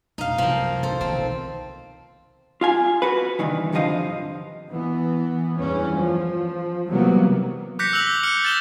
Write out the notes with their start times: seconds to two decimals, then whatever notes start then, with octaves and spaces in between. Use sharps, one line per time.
0.18 B1 F2 D#4 F5
0.38 C2 F#2 F3 A#3
0.83 D2 A4 C5
1.01 B1 D#3 C4
2.61 F4 F5 G#5
3.02 F#4 B4
3.39 C2 G2 D#3 E3
3.72 C2 G2 D3 F3 D#5 F5
4.68 E3 B3
5.57 E2 G2 E3 C#4
5.93 F3
6.87 C3 E3 F#3 G3 A#3 B3
7.79 D6 F#6 G6 A#6 B6 C#7
7.93 E6 F7 F#7
8.07 E6 F#6
8.23 F6 C#7
8.45 A6 E7 G7